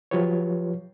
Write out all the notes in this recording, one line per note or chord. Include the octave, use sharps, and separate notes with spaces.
F3 F#3 F4 G4 B4 C#5